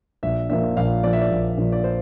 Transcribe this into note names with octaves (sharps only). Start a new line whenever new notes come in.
A#1 E5
A#2 F3 A#3 E5
A#1 F5
A#2 F3 A#3 D5
E5
D5
A#1
A#2 F3 A#3
D5
C5